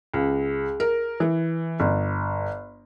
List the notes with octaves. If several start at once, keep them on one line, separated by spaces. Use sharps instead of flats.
C#2
A#4
E3
G1